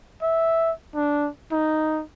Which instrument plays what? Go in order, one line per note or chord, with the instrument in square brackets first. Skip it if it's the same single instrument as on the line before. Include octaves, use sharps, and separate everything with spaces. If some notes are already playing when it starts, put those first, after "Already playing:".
[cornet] E5
D4
D#4